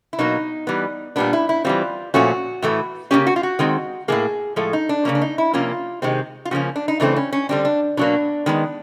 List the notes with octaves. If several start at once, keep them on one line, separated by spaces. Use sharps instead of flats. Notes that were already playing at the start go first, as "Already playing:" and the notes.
E4
B2 F#3 A#3 D#4
E3 G3 B3
A#2 G3 B3 D4
E4
E4
E3 G3 C4 F4
A#2 F3 A3 C#4 F#4
A2 E3 A3
C#3 F3 A#3 C#4 G4
F#4
F4
F#4
D#3 G#3 C4
A2 F3 A#3 G#4
A2 F3 G#3 A4
D#4
D4
C#3 F#3 A#3 C#4
D4
D#4
E4
C3 F3 A#3 C#4 F4
C3 D#3 G#3 C4
F4
C#3 F3 A#3 C#4 F#4
D4
D#4
C#3 E3 A3 C4 D4
C#4
C#4
D3 G3 C4 D4
D4
B2 F#3 A#3 D4
D#3 G#3 B3